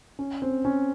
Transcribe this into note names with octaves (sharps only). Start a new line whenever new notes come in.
C#4
C4
C#4